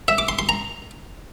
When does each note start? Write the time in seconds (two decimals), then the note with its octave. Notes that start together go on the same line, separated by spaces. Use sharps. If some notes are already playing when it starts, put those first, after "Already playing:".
0.08 E5
0.18 D6
0.29 C6
0.39 C6
0.49 A#5